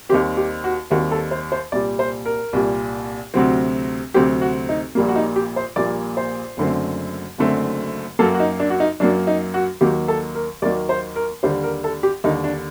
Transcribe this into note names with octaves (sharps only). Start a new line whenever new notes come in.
D#2 D#3 G3 C4 G4
G4
F#4
D#2 D#3 G3 C4 F#4
A4
C5
C5
C2 A#2 G3 D5
C5
A#4
C2 A#2 G3
D2 C3 F#3 C4
D2 C3 F#3 C4 G4
F#4
D#4
A#1 A#2 G3 A#3
F#4
D#4
G4
C5
A#1 A#2 G3 A#3 D5
C5
F#1 F#2 D3 A3 C4
F#1 F#2 D3 A3 C4
F#2 F#3 A#3 A4
F#4
D#4
D4
F#4
D#4
F#2 F#3 A#3 D4
D#4
F#4
D#2 D#3 F#3 A#3 G4
A4
A#4
D#2 D#3 F#3 A#3 D5
C5
A#4
D#2 D3 G3 C5
A#4
A4
G4
D#2 D3 G3 D#4
D4